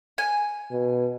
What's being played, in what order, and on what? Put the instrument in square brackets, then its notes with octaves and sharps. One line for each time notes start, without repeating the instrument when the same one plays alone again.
[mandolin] G#5
[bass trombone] B2